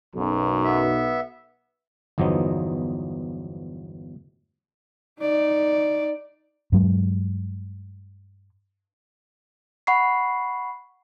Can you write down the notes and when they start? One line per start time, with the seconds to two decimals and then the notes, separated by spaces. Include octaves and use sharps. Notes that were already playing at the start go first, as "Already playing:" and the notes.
0.15 B1 F#2
0.64 B3 E5
2.18 G1 E2 F3 F#3 B3 D#4
5.20 D#4 D5
6.72 G2 F#3 G#3
9.87 F#5 B5 C#6 C7